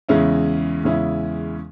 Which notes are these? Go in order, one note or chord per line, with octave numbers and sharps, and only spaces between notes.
E2 C#3 G#3 C#4 E4
E2 C#3 G#3 C#4 E4